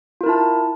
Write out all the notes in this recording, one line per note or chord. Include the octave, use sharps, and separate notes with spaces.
E4 F4 A#4 A5